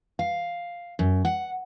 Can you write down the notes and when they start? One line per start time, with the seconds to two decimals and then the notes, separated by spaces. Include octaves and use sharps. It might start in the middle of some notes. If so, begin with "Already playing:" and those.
0.19 F5
0.99 F#2
1.25 F#5